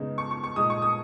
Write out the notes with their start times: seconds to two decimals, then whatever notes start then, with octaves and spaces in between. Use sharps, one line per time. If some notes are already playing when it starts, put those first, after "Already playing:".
Already playing: C#3 G#3 B3 D#4
0.18 C#6
0.31 C#6
0.43 C#6
0.56 A#2 G#3 D#4 D#6
0.70 C#6
0.82 D#6